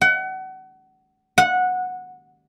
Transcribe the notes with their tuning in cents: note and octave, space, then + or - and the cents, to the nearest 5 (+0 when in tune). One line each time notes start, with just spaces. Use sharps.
F#5 +30
F#5 -15